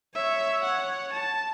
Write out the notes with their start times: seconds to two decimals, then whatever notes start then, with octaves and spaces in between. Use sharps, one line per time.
0.15 C#5 E5
0.64 F#5
1.13 A5